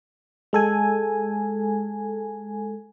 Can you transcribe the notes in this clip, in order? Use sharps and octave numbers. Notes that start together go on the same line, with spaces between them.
G#3 A4 G#5